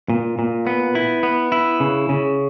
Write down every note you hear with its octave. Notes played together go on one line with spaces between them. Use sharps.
A#2
A#2
B3
E4
B3
E4
C#3
C#3